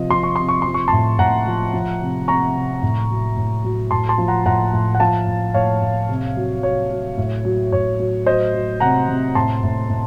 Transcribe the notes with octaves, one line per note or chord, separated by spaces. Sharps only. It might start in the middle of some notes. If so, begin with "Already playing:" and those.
Already playing: C3 F3 D#5
F3 C6
C#6
C3 C6
C#6
F3 C6
C#6
A2 A5 C6
A2 F#5 A#5
F3
F3
C3
C3 A#5 C#6
C3
A2
F#3
A2
F#3
A2 A5 C6
A5 C6
F3
F#5 A#5
A2 F#5 A#5
A2
F#5
F3 F5 A5
A2
A2 C#5 F5
A2
C3
F#3
F#3 C#5
F#3
A2
F#3
A2 C#5
F#3
F#3 C5 D#5
F#3
C3 F#5 A#5
C3
A2 A5 C6
A2
A2